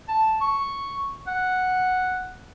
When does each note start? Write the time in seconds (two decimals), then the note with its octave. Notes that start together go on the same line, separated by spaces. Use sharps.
0.08 A5
0.41 C#6
1.27 F#5